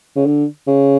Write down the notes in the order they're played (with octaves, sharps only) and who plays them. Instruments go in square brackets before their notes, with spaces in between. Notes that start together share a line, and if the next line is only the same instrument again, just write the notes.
[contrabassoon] C#3
D3
C#3